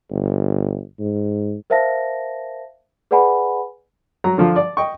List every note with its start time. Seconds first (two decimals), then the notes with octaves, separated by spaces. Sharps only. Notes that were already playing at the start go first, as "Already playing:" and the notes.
0.10 G1
0.99 G#2
1.70 A#4 C5 E5 F5 A5 A#6
3.11 G#4 B4 D5 F#5 G#5 B5
4.24 F#3 A#5
4.38 D3 F3 F4
4.56 D5
4.77 D#5 G5 C#6